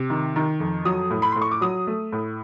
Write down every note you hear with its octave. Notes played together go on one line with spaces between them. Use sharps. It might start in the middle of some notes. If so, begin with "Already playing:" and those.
Already playing: C3
D#3
D#3
F2
F#3 D#6
A2
B5
A2 C6
C#6
D6
F#3 D#6
A3
A2